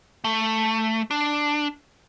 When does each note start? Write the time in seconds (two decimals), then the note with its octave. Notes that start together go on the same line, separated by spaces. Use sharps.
0.24 A3
1.11 D4